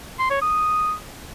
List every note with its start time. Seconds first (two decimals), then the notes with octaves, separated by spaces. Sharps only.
0.19 C6
0.30 C#5
0.41 D#6